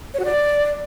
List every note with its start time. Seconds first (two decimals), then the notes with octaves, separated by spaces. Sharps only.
0.14 C#5
0.19 F#4
0.25 D5